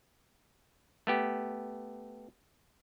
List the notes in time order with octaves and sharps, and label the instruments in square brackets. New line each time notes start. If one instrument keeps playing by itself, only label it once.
[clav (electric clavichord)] A3 B3 G4